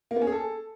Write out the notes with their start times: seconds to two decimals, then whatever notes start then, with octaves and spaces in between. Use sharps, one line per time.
0.11 A#3
0.16 B3
0.22 C#4
0.27 G#4
0.32 A4